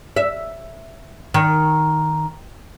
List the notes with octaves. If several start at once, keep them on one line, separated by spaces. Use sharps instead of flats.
E5
D#3